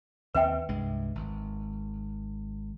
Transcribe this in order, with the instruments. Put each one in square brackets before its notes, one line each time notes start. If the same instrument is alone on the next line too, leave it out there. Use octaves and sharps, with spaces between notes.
[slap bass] D#2 C4 [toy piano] B4 E5 G5
[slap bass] C2 G2 G#3
G#1